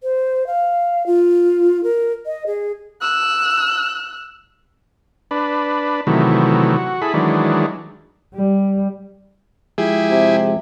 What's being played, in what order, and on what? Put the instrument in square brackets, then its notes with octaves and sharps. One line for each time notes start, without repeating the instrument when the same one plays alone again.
[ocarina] C5
F5
F4
A#4
D#5
G#4
[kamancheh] E6 F#6
[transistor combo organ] D4 B4
C3 D#3 E3 F#3 A3
F#4
E4 G#4 A4 B5
D#3 E3 F#3 G#3 D4
[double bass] G3
[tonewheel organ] F3 G#3 [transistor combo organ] E4 G4 G#4
[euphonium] C3